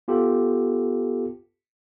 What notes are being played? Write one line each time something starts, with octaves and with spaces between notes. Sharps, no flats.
B3 F4 G4 A4